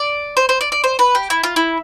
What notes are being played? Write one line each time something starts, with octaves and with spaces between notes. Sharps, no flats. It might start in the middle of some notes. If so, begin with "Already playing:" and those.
Already playing: D5
C5
C5
D5
D5
C5
B4
G4
E4
F4
E4